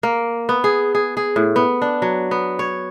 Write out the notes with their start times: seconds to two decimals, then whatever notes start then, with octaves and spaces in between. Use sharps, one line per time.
0.03 A#3
0.49 B3
0.64 G#4
0.95 G#4
1.17 G#4
1.36 A2
1.56 B3
1.82 D4
2.02 F#3
2.31 B3
2.59 C#5